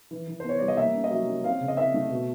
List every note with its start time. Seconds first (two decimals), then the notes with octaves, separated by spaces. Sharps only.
0.11 E3
0.27 E3
0.40 B3 C5
0.49 C#5
0.59 G3 D5
0.68 D#5
0.77 A#3 E5
0.95 C#4
1.04 D#5
1.11 F#3 E5
1.27 C#4
1.44 C4 F5
1.61 C#3
1.68 D#5
1.77 C4 E5
1.94 A3
2.10 B2